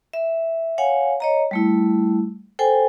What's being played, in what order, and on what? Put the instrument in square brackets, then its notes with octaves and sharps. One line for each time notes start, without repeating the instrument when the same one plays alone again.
[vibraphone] E5
C#5 F5 F#5 G#5
C#5 D#5 A#5
G3 A3 E4
A4 C5 G5 G#5